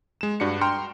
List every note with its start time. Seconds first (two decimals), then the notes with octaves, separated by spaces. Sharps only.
0.21 G#3 E7
0.40 G2 D4 F#4 C#7
0.61 G5 A#5 C6 F6